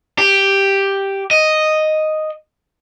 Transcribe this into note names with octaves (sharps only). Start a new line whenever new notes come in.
G4
D#5